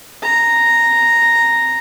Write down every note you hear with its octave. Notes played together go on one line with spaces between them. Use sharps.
A#5